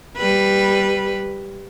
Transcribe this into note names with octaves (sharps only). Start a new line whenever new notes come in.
G3 B4